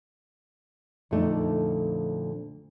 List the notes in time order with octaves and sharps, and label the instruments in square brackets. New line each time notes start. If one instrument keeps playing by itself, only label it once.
[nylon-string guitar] F2 A#2 D3 A3 D4 D#4